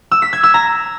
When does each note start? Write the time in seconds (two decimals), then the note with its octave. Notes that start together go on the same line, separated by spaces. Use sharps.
0.12 E6
0.22 B6
0.33 G#6
0.43 E6
0.54 A#5